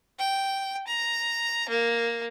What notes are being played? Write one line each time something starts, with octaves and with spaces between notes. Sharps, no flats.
G5
A#5
A#3